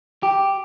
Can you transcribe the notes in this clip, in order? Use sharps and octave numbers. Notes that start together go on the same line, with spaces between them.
G4